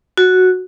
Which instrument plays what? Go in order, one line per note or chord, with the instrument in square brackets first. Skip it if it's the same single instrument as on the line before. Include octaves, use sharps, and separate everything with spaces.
[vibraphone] F#4